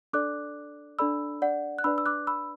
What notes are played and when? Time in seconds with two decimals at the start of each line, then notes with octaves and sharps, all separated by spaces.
0.13 D4 A4 D5 D6 F#6
0.99 D4 A4 D5 B5 E6
1.42 D5 F#5
1.79 F#6
1.84 D4 B4 D5 B5 E6
1.98 E6
2.06 D6 F#6
2.27 B5 E6